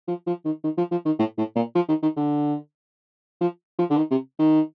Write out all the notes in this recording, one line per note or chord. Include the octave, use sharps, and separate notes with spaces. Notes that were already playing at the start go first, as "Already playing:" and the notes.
F3
F3
D#3
D#3
F3
F3
D#3
A2
A2
A#2
F3
D#3
D#3
D3
F3
F3
D3
D#3
C3
D#3